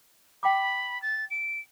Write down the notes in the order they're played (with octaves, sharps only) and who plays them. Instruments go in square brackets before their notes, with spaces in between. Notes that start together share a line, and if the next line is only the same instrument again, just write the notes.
[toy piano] G5 D6 [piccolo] B5
[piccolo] A6
D7